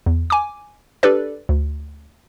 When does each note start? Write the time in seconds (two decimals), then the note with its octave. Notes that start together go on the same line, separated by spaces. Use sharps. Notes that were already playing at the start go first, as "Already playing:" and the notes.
0.06 E2
0.30 G#5 D6
1.03 D4 G4 A4 B4 D5
1.49 D2